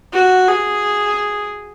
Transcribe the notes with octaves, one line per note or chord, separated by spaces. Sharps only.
F#4
G#4